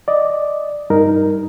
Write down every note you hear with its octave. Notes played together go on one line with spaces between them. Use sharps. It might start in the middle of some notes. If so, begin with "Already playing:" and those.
D5 D#5
G2 D#4 A#4